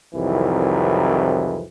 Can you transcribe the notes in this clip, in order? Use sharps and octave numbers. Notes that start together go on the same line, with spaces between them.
C2 F2 D#3 E3 F#3